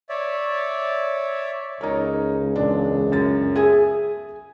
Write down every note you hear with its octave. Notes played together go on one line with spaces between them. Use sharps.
C#5 D5 E5
C#2 D#4 A#4 C#5
E1 G#3 D4
F#2 A6
G#4 E5 G#5 D#6